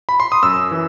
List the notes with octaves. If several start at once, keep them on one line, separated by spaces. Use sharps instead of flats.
B5
C6
D#6
F#2 E6
E3